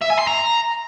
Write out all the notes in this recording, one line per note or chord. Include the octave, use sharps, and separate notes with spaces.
E5
G#5
C6
A#5